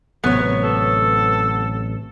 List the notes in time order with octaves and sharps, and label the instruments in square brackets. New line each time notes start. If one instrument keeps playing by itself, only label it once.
[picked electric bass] A1 C3 F#3 [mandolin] B3 C#5
[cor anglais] A4